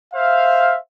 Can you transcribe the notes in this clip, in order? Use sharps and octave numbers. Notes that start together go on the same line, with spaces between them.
C5 E5 F5